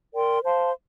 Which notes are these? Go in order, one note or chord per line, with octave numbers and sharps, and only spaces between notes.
A#4 D5 G5 C6
C5 F5 A5 C6